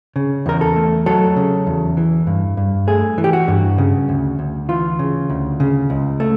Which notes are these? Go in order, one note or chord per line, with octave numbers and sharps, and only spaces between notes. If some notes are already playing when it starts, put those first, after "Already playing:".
C#3
E2 A#4
A4
A3
F#3 A4
C#3
E2
E3
G2
G2
A3 G#4
E3
G4
F#4
G2
C#3
D2
D2
E3 F4
C#3
D2
C#3
C#2
A3